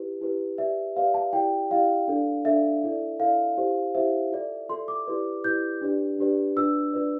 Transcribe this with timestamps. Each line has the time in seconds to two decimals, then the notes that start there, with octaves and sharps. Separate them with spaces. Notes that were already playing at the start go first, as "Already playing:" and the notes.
Already playing: E4 G4 B4
0.21 E4 G4 B4
0.58 G4 B4 D5 E5
0.96 G4 B4 D5 F5
1.14 A5
1.33 E4 G4 D5 G5
1.71 E4 G4 D5 F5
2.08 D4 A4 D5
2.45 D4 A4 D5 E5
2.83 E4 A4 D5
3.20 E4 A4 D5 F5
3.57 E4 G4 C5
3.94 E4 G4 C5 E5
4.32 F4 A4 D5
4.69 F4 A4 D5 C6
4.88 D6
5.07 E4 G4 B4 D5
5.44 E4 G4 B4 D5 G6
5.81 D4 G4 B4 D5
6.19 D4 G4 B4 D5
6.57 D4 F4 B4 D5 E6
6.93 D4 F4 B4 D5